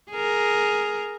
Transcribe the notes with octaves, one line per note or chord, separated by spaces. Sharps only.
G#4 A#4